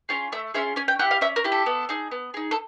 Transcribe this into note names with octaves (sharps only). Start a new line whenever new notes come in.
C#4 F4 G#4 C#5
A3 E5
C#4 F4 G#4 E5
C#4 G#5
G5
E4 G4 F#5
F5
C#4 E5
A#4
E4 G4
A4
B3
D#4 G#4
B3
D#4 G#4
A4